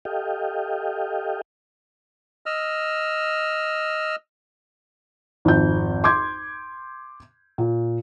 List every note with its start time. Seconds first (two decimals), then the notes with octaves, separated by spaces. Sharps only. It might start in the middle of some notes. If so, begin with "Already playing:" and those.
0.05 G4 A4 D#5 F5 G5
2.46 D#5 E6 F6
5.45 G#1 F2 G6
6.04 C6 D6 G6 G#6
7.58 A#2